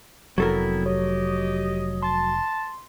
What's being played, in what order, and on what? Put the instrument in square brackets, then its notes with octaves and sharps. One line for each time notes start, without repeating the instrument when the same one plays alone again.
[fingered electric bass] F1 [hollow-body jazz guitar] F#3 A4 A#4 [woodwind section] B3 C4 E4
[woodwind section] G4 D#5 [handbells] C#5
[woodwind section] A5 [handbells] C6